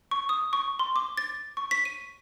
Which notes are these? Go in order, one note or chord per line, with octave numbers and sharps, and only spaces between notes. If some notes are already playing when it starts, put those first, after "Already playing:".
C#6
D#6
C#6
C6
D6
A6
C#6
B6
D#7